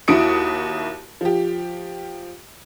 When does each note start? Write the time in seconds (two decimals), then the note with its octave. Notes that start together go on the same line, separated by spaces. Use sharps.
0.08 D#2 E4 F#4 D#6 C#7 D7
1.21 F3 G4